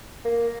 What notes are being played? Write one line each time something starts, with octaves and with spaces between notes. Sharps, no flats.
A#3